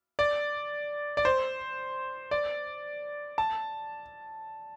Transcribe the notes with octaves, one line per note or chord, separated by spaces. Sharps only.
D5
D5
C5
D5
A5